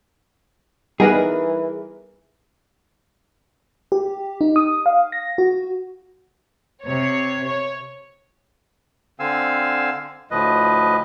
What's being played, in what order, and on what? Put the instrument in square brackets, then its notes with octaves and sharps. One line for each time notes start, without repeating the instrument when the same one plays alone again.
[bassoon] E3 [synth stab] G3 A#4 B4 [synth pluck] B3 D#4 G#5 [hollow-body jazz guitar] G#4
[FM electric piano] G4
D#4
D#6
F5
A#6
F#4
[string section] C3 C#5
C#5
[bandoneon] D3 C4 F5 G#5 E6
D2 A2 F3 B4 D#5